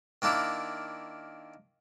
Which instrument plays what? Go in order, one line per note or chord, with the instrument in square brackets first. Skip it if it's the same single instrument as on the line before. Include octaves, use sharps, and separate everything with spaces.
[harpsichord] D#3 A#3 D4 E4